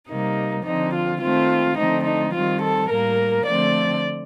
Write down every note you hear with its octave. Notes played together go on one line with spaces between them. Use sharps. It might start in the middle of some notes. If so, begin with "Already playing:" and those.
C3 G3 A#3 D#4
D3 F3 C4 D#4
F4
D#3 A3 C4 F4
D3 F3 A3 C4 D#4
D#4
D#3 G3 C4 F4
A4
A2 G3 A#3 A#4
D3 F3 A3 C4 D5